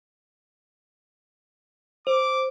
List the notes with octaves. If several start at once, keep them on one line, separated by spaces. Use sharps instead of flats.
C5 D6